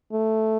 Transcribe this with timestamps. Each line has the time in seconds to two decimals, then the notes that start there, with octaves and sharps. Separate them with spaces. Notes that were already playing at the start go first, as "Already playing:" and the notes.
0.12 A3